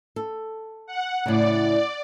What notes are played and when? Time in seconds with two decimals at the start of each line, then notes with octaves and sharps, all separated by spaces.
0.16 A4
0.86 F#5
1.26 A2 C#3 D5